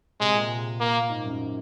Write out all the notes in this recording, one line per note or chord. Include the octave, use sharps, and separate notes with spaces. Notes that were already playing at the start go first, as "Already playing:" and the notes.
C3 G#3
A#2
A#3
G#2
F#2